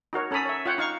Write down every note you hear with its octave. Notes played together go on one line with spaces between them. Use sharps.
D#4 F#4 A#4 C#5
C#4 A4 A#5 B5 D#6
C#5 E5
F4 C#5 F#5 G5
D#4 F5 C#6